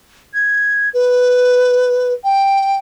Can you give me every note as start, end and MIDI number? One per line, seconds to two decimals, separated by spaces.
0.34 0.89 92
0.94 2.13 71
2.24 2.78 79